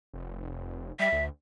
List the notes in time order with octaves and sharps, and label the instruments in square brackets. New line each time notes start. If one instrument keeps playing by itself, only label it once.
[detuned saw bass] F1
[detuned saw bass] G3 [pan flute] E5
[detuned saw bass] D2